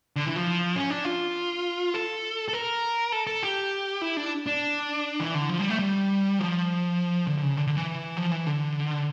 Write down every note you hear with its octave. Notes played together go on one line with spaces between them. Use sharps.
D3
E3
F3
C#4
D4
F4
A4
A4
A#4
A4
A4
G4
E4
D4
D4
E3
D3
F3
G3
A3
G3
F3
D3
D3
C#3
D3
D3
E3
F3
E3
D3